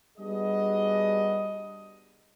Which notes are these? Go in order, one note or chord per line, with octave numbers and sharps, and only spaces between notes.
G3 B3 D4 F#4 G#4 D#5